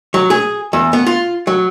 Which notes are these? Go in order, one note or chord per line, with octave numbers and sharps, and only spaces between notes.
F#3
G#4
E2
B3
F4
F#3